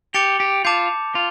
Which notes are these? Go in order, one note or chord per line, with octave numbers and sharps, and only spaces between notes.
G4 D6 A6 C#7 F7
G4
F4 A5 D6 G6
F4